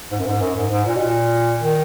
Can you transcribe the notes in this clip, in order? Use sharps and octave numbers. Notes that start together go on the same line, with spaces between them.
G#2
F#2
G#2
F#2
G#2
G#2
A#2
B2
A#2
D#3